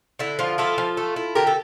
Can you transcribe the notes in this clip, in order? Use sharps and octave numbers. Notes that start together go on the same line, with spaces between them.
D3 E4
F3 F4
E4 F4 A4
F3
A3
E4
D3 G4 A#4
A4